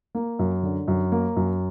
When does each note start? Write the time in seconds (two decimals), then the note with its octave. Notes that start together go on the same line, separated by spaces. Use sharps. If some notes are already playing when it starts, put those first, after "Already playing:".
0.15 A#3
0.39 F#2
0.63 D3
0.88 F#2
1.12 A#3
1.36 F#2